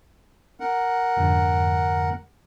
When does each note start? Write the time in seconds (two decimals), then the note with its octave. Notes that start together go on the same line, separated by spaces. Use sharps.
0.60 A#4 F#5
1.17 F2 G#2 D3